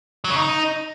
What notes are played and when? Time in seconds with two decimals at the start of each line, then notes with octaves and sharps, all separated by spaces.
0.24 F#3
0.30 C#3
0.36 D#4